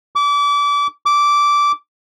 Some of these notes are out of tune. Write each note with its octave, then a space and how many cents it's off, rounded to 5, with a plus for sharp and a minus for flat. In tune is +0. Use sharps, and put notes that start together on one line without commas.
D6 -30
D6 -15